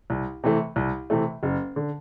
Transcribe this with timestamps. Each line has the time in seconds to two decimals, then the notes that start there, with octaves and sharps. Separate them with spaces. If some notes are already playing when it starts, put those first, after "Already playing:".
0.10 C2
0.44 C3 E3 A3
0.76 C2
1.10 C3 E3 A3
1.43 F#1
1.76 D3